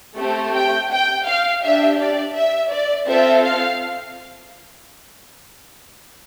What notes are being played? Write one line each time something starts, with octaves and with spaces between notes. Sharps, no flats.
A3 C4 G4
G5
G5
F5
D4 G4 E5
D5
E5
D5
C4 F4 A4 E5
F5